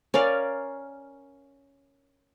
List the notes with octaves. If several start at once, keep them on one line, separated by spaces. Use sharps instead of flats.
C#4 A#4 D5 F5